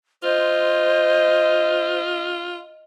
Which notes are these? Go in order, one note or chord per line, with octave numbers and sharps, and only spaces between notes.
F4 C5 D#5